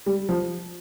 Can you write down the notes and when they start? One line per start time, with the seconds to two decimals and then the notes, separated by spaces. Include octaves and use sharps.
0.06 G3
0.29 F3